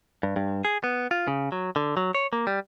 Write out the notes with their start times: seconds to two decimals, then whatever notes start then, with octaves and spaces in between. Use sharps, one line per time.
0.23 G2
0.36 G2
0.65 G#4
0.84 B3
1.11 F4
1.28 C#3
1.52 F#3
1.76 D3
1.97 F#3
2.15 C#5
2.33 A#3
2.47 G3